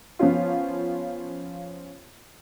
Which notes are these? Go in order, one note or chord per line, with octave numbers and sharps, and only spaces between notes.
F3 B3 C#4 F4